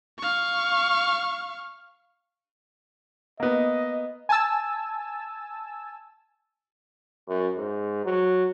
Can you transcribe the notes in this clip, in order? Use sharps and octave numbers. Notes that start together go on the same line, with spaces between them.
F5 C#6
A#3 B3 D#5
G#5 A5 E6
F#2
G#2
F#3